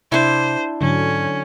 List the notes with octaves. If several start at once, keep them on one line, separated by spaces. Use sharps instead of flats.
C3 D4 E4 C5
G#2 D3 F#3 C#4